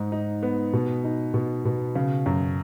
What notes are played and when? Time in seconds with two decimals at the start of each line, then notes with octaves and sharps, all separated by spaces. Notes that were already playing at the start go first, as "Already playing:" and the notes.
Already playing: G#2 D#4
0.12 D#4
0.43 B3
0.73 B2
1.04 D#4
1.34 B2
1.65 B2
1.96 C#3
2.26 F#2